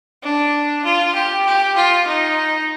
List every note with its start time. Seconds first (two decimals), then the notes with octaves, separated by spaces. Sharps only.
0.23 D4
0.84 F4
1.15 G4
1.45 G4
1.76 F4
2.07 D#4